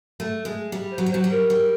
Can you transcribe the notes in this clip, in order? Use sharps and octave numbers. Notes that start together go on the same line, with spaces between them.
A3
G#3
G3
C5
F#3
G3
C5
F#3
G3
A#4
G3